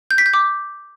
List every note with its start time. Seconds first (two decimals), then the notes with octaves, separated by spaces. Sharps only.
0.11 G6
0.18 B6
0.26 G6
0.33 D6